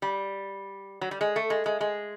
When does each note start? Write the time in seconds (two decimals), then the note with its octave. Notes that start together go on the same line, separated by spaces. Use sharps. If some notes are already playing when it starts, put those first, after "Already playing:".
0.02 G3
1.01 F#3
1.11 G3
1.21 G#3
1.36 A3
1.50 G#3
1.66 G#3
1.81 G#3